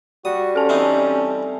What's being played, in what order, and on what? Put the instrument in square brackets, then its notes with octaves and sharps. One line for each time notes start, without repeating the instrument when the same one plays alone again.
[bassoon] G3 [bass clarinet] F#4 [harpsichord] D#6
[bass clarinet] C#4 [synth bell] A4 A5
[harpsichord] E3 C4 D#4